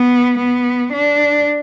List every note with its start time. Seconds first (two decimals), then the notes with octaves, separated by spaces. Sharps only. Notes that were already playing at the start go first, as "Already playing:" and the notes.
Already playing: B3
0.38 B3
0.93 D4